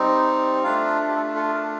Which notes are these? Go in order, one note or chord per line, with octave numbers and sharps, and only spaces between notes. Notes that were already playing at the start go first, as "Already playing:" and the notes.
Already playing: G3 C4 D#4
A3 D4 F4 F5
A4
G4
A4
A4
A#4